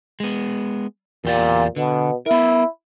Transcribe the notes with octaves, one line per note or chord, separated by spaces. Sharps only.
G#3 B3
E2 A#2 G4 D5
B2 D3
B3 E4 A#4